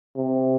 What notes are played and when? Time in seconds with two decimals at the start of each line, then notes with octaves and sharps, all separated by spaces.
0.16 C3